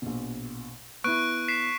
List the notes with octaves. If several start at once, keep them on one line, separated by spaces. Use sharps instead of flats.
A#1 B2
B3 E4 C#6 F#6 D7
B6 C7 E7